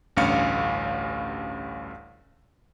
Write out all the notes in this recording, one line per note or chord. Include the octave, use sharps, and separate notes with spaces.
A1 D2 G2 C#4 F5 C#7